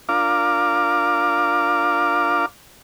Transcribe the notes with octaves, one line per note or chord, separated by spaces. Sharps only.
D4 F4 A#4 F5 D6